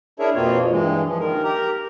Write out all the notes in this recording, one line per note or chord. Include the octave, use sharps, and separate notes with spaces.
D4 E4 G#4 A#4 C#5 E5
F2 B2 A#3 C4 F4 C#5
G2 E3 G#3
F3
D#2 D#3 A#4
G4 A#4 A#5